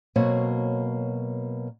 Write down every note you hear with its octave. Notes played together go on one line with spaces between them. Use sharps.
B2 F#3 A#3 C4 F#4 C#5